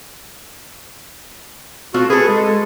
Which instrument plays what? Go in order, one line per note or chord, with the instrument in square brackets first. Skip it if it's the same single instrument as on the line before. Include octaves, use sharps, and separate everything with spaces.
[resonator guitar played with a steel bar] A3 C4 F4 [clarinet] F#4
[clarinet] G#4 [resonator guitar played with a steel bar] A4 B4
[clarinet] G#3